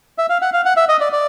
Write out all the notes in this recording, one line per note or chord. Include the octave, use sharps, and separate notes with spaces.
E5
F5
F#5
F5
F#5
E5
D#5
D5
D5